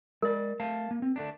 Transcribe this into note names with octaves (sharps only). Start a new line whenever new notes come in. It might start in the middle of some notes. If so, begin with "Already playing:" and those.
G#3 A#4 D5
A3 F5 A5
A#3
C4
D3 A3 D4